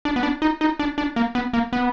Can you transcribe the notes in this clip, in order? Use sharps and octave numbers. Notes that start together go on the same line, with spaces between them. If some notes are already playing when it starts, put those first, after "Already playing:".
D4
B3
D4
D#4
D#4
D4
D4
A#3
B3
A#3
B3